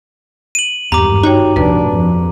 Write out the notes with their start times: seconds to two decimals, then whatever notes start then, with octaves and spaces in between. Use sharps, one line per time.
0.55 D#7 F#7
0.92 G#1 E2 G2 G4 A#5 D6
1.23 D#4 F#4 C#5 G5
1.56 F1 D2 D4 B4
1.91 F2